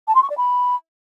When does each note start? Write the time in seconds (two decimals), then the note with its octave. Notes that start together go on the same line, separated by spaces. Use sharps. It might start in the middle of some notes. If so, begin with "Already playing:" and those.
0.07 A5
0.15 C6
0.22 C#6
0.30 D5
0.37 B5